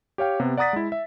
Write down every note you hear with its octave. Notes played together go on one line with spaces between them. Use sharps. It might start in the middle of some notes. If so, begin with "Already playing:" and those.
G4 C#5 F5 G5
C3 B3
D5 F#5 A#5 D#6 A6 B6
G#3 E4
E5